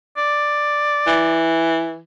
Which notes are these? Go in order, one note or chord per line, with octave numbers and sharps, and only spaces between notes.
D5
E3